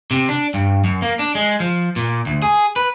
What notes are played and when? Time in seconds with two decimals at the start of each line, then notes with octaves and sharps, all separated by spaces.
0.11 C3
0.29 D4
0.54 G2
0.84 F#2
1.02 A#3
1.19 D4
1.35 G#3
1.60 F3
1.96 A#2
2.26 D2
2.42 G#4
2.76 B4